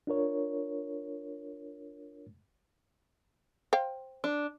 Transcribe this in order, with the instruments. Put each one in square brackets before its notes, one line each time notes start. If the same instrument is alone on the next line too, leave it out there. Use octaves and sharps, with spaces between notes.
[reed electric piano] D4 F4 A#4 C#5
[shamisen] C5 F5 G5
[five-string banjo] D4